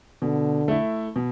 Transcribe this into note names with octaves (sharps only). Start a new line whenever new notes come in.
B2 D3
A3 E4
B2